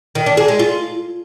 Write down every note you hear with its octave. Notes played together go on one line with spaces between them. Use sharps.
D#3
D4
G#4
G#3
F4